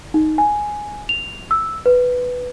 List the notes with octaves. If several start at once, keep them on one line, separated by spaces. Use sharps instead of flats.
D#4
G#5
F7
E6
B4